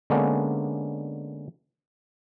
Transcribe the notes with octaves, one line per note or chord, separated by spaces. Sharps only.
D3 G#3 A#3 B3 C#4 D4